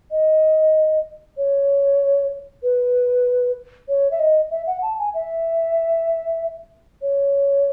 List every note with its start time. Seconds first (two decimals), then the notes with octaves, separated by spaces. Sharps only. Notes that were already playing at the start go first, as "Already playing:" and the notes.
0.11 D#5
1.37 C#5
2.63 B4
3.89 C#5
4.11 E5
4.19 D#5
4.51 E5
4.67 F#5
4.82 A5
4.99 G#5
5.14 E5
7.02 C#5